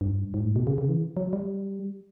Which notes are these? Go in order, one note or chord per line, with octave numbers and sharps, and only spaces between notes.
G2
G#2
A2
B2
C#3
C#3
E3
F#3
G3